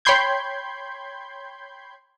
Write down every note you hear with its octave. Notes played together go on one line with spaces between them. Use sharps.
C#5 G5 B5 C6 G6 G#6